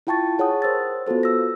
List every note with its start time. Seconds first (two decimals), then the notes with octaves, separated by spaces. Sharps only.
0.07 E4 F4 G5 A5 C#6 A6
0.39 G#4 C#5 F#5 A5 D#6
0.62 A#4 C5 E6 A6
1.07 B3 F4 F#4 A4 C5
1.23 E6 A#6